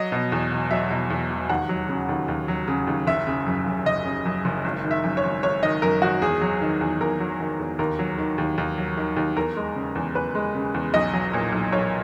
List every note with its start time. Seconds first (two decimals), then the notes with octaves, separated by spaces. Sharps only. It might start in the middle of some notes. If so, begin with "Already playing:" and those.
Already playing: F#3 D#5
0.12 B2
0.32 E2
0.52 E1
0.71 F#3 E5
0.91 B2
1.10 E2
1.30 E1
1.49 D#2 F#5
1.69 F#3
1.89 C#3
2.09 D#2
2.28 D#2
2.48 F#3
2.68 C#3
2.87 D#2
3.07 F#1 E5
3.27 C#3
3.47 F#2
3.66 F#1
3.86 F#1 D#5
4.05 C#3
4.25 F#2
4.45 F#1
4.65 G#1
4.84 D#3
4.91 E5
5.04 F#2
5.17 C#5
5.23 G#1
5.43 G#1 C#5
5.63 D#3 D#5
5.82 F#2 A#4
6.02 G#1 F#4
6.22 E2 G#4
6.41 F#3
6.61 D#3
6.81 E2
7.01 E2 A#4
7.20 F#3
7.40 D#3
7.59 E2
7.79 D#2 A#4
7.99 F#3
8.18 D#3
8.38 D#2
8.58 D#2
8.78 F#3
8.97 D#3
9.17 D#2
9.36 E2 A#4
9.57 G#3
9.75 C#3
9.95 E2
10.15 E2 B4
10.35 G#3
10.55 C#3
10.74 E2
10.94 B1 D#5
11.13 F#3
11.33 A#2
11.52 B1
11.72 B1 C#5